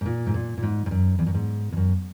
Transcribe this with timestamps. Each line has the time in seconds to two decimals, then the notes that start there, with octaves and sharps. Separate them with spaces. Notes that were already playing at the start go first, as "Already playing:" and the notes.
0.01 G#2
0.06 A#2
0.26 G#2
0.34 A#2
0.58 A#2
0.63 G#2
0.86 G#2
0.91 F#2
1.19 E2
1.26 F#2
1.34 G#2
1.72 E2
1.77 F#2